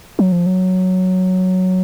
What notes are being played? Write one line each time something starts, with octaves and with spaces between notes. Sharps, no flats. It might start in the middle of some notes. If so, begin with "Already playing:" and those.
F#3
F3
F#3